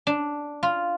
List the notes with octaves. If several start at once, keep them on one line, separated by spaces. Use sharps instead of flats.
D4
F4